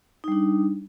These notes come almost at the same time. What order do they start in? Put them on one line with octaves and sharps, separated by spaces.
D#4 G3 D4